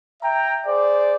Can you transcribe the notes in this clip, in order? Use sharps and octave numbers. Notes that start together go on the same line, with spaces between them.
E5 G5 A#5
G#4 C5 D5